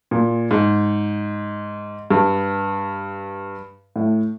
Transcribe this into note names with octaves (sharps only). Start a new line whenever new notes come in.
A#2
G#2
G2
A2